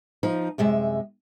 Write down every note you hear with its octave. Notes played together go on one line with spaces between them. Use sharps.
F3 D#4
F#2 C3 G#3 E5